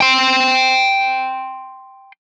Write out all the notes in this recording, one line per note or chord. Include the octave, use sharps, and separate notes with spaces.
G5 C6